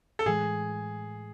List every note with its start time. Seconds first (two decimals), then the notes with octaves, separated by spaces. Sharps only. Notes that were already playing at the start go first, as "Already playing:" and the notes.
0.19 A4
0.26 A2 E3 G#3 G#4